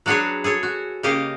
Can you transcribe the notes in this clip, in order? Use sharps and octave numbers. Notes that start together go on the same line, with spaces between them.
F#3 D4 F#4 G#4 B4 C#5
G#4 A4 C#5
F#4
C#3 A#3 G4 D#5 F5